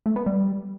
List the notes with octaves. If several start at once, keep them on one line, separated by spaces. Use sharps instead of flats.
A3
B3
G3